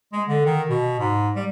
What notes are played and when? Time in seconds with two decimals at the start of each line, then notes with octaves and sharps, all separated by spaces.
0.13 G#3
0.28 D3
0.45 D#3
0.69 B2
1.00 G#2
1.35 G3